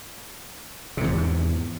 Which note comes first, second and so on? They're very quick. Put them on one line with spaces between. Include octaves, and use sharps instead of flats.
C3 G#2 E2